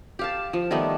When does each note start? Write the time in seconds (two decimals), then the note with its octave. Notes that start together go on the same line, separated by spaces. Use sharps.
0.19 G4 F5 A5
0.53 F3
0.71 D#3 G3 A3 B3